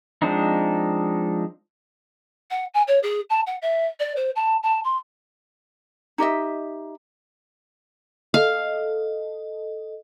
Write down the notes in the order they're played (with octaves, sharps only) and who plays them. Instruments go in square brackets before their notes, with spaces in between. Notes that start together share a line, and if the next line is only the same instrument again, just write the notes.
[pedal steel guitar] F3 G#3 C4 D4 D#4
[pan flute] F#5
G#5
C#5
G#4
A5
F#5
E5
D5
C5
A5
A5
C6
[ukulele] D#4 G4 D#5 E5
[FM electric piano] A4 D#5 [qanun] F5